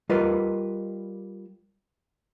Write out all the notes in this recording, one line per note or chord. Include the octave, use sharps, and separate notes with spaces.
G3 F4 A#4 B4 D#5